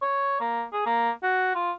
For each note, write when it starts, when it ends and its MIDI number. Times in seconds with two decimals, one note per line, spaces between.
0.02 0.37 73
0.41 0.64 58
0.73 0.85 68
0.86 1.11 58
1.23 1.55 66
1.55 1.72 65